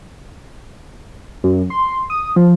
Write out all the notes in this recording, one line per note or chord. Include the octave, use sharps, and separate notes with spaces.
F#2
C6
D#6
F3